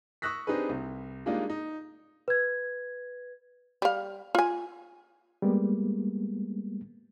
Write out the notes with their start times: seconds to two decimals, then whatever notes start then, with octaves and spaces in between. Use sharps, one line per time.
0.22 C#6 D#6 E6 F#6 A#6 B6
0.47 C4 D4 D#4 G4 G#4 B4
0.69 C2
1.26 G3 G#3 A#3 D4 D#4 F4
1.50 D#4
2.28 B4 G#6
3.82 G3 F5
4.35 F4 G#5
5.42 G3 G#3 A#3 B3